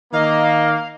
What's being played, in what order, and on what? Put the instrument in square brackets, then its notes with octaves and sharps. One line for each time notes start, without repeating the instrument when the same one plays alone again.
[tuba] D#3 [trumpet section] A#3 [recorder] D#5 [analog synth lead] F5